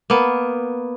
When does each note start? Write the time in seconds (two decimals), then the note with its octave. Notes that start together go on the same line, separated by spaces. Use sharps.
0.10 A#3 B3